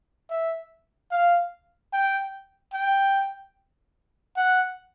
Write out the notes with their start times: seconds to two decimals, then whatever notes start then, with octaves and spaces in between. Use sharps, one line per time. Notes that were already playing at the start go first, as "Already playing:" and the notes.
0.30 E5
1.11 F5
1.93 G5
2.74 G5
4.37 F#5